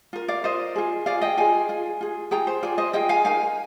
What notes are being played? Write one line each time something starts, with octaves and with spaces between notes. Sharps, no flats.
F4 A#4
D5 F5
F4 A#4 C5 D#5
F4 G#4
F4 G#4 D5 F5
D#5 G5
F4 G#4 F5 G#5
F4 G#4
F4 G#4
F4 G#4 G5 A#5
C5
F4 G#4 D5
C5 D#5
F4 G#4 D#5 G5
F5 G#5
D#4 A#4 F5 G#5